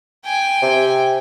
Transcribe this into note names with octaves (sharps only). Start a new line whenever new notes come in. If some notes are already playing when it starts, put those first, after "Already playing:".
G5 G#5
C3